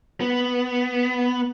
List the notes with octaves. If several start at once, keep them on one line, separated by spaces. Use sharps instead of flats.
B3